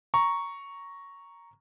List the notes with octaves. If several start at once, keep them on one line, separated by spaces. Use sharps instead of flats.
A#5 C#6